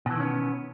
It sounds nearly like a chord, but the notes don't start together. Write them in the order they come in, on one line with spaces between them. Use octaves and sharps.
B2 E3 D#3 C#4 B3